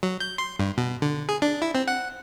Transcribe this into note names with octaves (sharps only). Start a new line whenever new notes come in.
F#3
G6
C6
G2
B2
D3
G#4
D4
E4
C4
F#5